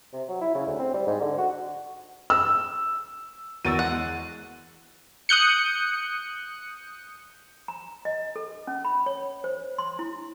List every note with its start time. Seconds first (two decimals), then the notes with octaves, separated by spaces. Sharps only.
0.13 C3
0.28 F#3
0.41 E4
0.54 C#3
0.66 D2
0.79 C4
0.94 G3
1.06 G#2
1.21 D3
1.38 F#4
2.30 E6
3.65 E2 F#4 A#4 C#5 E6 A6 D#7
3.79 G#3 F#5 F#6
5.29 D#6 F#6 G6 C#7
7.68 A#5
8.05 D#5
8.36 A4
8.67 C#4
8.85 B5
9.06 C#5
9.44 C5
9.78 C6
9.99 E4